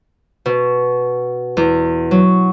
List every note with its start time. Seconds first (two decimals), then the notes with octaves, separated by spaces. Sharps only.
0.46 B2
1.57 E2
2.11 F#3